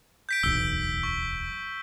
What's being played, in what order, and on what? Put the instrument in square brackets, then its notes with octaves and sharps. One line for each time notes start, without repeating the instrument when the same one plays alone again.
[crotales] G6 B6 D7
[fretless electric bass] D1 B1 E2 [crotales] E6 D7 G7
[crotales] C#6